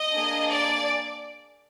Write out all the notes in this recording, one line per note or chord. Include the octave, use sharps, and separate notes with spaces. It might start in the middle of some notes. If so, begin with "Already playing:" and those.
Already playing: D#5
A#3 D4 G#4
D5